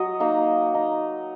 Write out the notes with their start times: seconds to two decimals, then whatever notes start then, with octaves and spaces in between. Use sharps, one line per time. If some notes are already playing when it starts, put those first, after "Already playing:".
Already playing: F#3 D#5
0.20 A#3 D#4
0.75 D#4